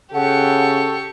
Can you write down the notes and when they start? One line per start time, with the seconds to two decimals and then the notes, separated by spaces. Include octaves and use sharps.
0.14 C#3 G4 A4 F#5 C#6